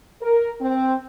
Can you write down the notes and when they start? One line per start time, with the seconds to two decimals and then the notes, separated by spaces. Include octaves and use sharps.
0.22 A#4
0.61 C4